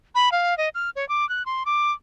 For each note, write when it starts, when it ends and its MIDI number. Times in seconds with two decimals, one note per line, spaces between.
0.15 0.32 83
0.32 0.57 77
0.58 0.69 75
0.75 0.90 89
0.96 1.07 73
1.09 1.28 86
1.29 1.45 90
1.46 1.63 84
1.66 1.92 86